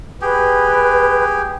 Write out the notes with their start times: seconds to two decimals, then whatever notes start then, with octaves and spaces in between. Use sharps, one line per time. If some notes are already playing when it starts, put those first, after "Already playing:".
0.21 G4 G#4 B4